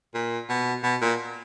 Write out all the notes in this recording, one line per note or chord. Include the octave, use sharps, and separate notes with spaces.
A#2
B2
B2
A#2